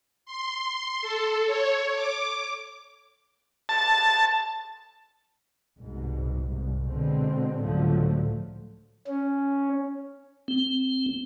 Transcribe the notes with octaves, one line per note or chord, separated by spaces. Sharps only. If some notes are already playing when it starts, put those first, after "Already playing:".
C6
A4
C#5
D6
A5
C2 G#2 B2
C2
B2 D3 G#3 C4
C#2 A2 D3 F3 F#3 A3
C#4
C4